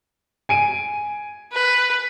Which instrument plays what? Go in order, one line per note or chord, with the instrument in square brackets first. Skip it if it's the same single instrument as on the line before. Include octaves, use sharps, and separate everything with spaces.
[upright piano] G#5 D7 D#7
[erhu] B4